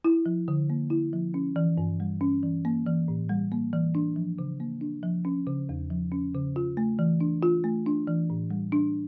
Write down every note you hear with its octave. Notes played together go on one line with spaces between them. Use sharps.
E4
F3
D3
A#3
E4
F3
C#4
E3
G2
G3
C#4
E3
A#3
E3
A2
G3
A#3
E3
D4
F3
C#3
A#3
D4
F3
C#4
C#3
E2
F3
C#4
C#3
F4
A3
E3
D4
F4
A3
D4
E3
A2
G3
D4